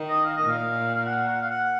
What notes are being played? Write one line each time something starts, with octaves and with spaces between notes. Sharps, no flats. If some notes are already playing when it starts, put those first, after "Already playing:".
Already playing: D#3
D#5
F5
A#2 D#5
F5
F5
F#5
F#5
F5
F#5